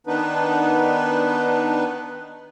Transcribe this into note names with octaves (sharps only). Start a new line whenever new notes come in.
D#3 B3 D4 D#4 B4